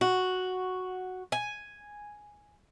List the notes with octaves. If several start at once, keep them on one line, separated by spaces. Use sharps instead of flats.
F#4
G#5